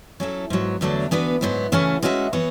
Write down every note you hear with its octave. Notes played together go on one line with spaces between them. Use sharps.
F#3 C#4 E4 A4
G#2 F#3 B3
E2 D3 F#3 A3 D4
E3 B3 D4 F#4 B4
G#2 F#3 B3 E4
C#3 E3 A3 C#4 F#4
G#3 C#4 F#4 A4 E5
E3 B3 F#4 C#5